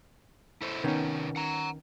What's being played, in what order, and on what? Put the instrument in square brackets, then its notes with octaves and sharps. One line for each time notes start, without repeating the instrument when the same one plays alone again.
[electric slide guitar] E4 A4 C5
[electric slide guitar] C3 D#4 [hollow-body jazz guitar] D#3 B3 C#4
[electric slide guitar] F#5 A#5